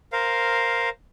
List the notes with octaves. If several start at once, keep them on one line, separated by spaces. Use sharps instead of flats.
A#4 C5 F5